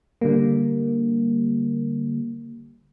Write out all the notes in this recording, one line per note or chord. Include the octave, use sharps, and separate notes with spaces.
D3 G3 A#3